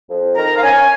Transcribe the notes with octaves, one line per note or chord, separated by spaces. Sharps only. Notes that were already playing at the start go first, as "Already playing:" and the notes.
F2
D#3 A#5
F5
C#4 G#5